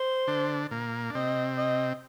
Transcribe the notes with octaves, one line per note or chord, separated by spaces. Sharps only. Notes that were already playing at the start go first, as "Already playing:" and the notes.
Already playing: C5
D3 D4
A#2 A#3
D4
C3 C4 D#5
D#5